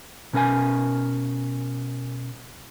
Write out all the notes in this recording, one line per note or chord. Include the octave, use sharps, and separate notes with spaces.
B2 C#4 A#4 D#5 G#5